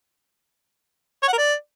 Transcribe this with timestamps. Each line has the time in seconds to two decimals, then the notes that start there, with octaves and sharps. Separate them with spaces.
1.23 C#5
1.28 F#5
1.33 A#4
1.38 D5